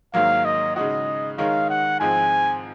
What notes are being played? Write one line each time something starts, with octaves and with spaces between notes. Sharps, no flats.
G#2 D#3 F#3 A#3 F5
D#5
C#3 G#3 D#4 F#4 D#5
D#3 G#3 D#4 A#4 C#5 F5
F#5
G#2 F3 G#3 C4 G#5